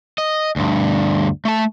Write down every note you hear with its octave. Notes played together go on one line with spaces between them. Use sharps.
D#5
D2 G2
A3 A5